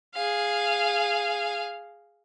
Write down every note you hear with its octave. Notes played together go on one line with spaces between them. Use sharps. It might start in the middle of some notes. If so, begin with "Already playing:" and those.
G#4 F5